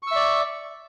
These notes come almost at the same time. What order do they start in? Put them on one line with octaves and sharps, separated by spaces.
C#6 E6 E5 D5